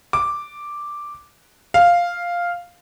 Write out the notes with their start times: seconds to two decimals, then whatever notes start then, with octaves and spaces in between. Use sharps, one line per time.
0.13 D6
1.74 F5